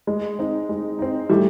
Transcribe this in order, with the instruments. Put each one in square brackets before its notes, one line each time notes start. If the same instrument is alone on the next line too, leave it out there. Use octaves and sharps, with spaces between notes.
[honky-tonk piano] G#3
C4 D#4
G#3
C4 D#4
[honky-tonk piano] E3 [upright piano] G3 A3